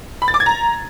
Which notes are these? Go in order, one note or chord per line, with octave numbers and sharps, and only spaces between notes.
B5
A6
D6
G#6
A#5